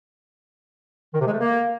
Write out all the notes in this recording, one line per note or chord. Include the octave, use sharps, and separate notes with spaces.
D#3
C3
G#3
A3
A#3